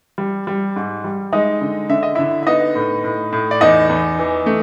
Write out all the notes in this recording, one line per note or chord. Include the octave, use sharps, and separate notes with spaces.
G3
G3
G#2
G3
G#3 D#4 D#5
D3
D3 E5
D#5
D3 E4 E5
E5
B3 D#4 D#5
A2
A2
A2
D5
E2 D#4 D#5
E2
E3
A3